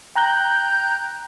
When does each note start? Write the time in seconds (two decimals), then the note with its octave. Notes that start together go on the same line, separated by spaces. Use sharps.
0.15 G5 A#5 F#6 G6